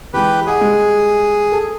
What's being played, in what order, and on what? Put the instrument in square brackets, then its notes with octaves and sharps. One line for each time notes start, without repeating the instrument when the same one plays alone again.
[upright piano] E3 G#3 [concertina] G4 B4
[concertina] G#4 [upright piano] D#5 F#5 G#5
[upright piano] G3 G#3
A4